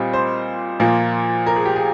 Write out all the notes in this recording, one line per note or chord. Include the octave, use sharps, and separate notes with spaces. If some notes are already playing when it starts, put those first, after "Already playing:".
Already playing: A#2 G3 C4 D#5
C5
A#2 F3 A#3
A#4
G#4
G4
G#4